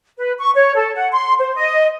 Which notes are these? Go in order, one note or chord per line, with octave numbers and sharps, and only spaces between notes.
B4
C#6
C#5
A4
F#5
C6
C5
D#5